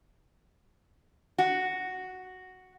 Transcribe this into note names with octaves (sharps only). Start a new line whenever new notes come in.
F#4